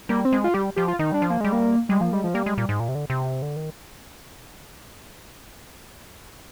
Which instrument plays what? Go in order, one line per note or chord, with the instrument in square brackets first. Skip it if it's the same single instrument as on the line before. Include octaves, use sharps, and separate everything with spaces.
[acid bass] G3 [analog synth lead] A#3
[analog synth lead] C4
[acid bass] G#3
[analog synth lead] F4
[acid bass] G3 [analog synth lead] G4
[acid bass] F3 [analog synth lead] G4
[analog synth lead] F4
[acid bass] D#3 [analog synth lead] D#4
[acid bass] G3 [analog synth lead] D4
[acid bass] F3
[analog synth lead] A#3
[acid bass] G3 [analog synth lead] G#3
[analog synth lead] A#3
[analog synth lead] G3 [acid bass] G#3
[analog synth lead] F3 [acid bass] A#3
[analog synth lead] G3 [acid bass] G#3
[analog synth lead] F3
[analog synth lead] G3 [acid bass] A#3
[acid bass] G#3
A#2
G#2
A#2
C3
D3
C3
D3
D#3